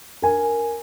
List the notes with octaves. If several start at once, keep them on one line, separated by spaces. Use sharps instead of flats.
A#4 G#5